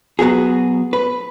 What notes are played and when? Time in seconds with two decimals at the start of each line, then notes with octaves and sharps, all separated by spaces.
0.19 F#3 B3 F#4 G#4
0.93 B4